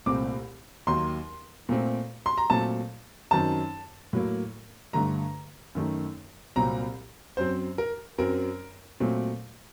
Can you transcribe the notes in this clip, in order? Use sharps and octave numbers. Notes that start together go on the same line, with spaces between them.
C2 A#2 A3 C4 D6
D#2 D#3 F#3 A#3 C6
A#2 A3 C4
C6
A#5
A#2 F#3 A3 C4 A5
F#2 D#3 F#3 C4 A5
A2 F#3 A#3
G2 D3 A3 A#5
F#2 D#3 A3
C2 A#2 F#3 C4 A#5
F#2 F#3 C4 C5
A#4
F#2 F#3 C4 A#4
A#2 F#3 A3 C4